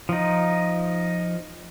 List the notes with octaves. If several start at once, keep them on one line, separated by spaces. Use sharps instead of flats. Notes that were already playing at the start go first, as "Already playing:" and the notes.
F3 D#4